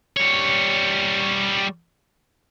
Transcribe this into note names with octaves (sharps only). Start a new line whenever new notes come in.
G3 C#5